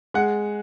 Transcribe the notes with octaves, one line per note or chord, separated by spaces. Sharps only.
G#3 F#5